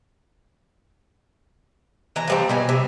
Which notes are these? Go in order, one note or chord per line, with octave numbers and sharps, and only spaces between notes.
E3 A#5
F3 G3 C4
B2 G3 G#5
C3